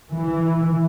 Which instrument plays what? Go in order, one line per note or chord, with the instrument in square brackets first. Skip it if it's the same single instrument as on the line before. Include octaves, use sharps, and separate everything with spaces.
[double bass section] E3